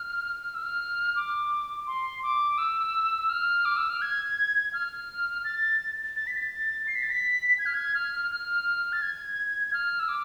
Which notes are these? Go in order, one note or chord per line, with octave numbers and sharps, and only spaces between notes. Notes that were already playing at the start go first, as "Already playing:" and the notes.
Already playing: F6
F6
E6
F6
D6
C6
D6
E6
E6
F6
D6
E6
F6
G#6
F6
A6
A6
B6
A6
C7
B6
A6
B6
G#6
F6
G#6
F6
F6
F6
A6
G#6
G#6
F6
E6
D6